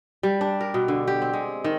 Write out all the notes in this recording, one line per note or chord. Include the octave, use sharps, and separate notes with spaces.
G3
D4
A#4
B2
D3
G4
C4
G#3
D#3